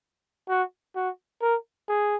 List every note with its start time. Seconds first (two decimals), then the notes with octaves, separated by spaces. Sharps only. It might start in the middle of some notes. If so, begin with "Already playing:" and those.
0.49 F#4
0.96 F#4
1.42 A#4
1.89 G#4